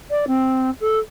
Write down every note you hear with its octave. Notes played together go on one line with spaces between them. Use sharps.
D5
C4
A4